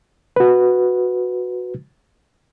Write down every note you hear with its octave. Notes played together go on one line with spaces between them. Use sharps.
F#4 B4